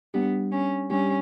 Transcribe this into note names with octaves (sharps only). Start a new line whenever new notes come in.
G3 B3 D4 G4
C#4
G3 C#4 D4 G4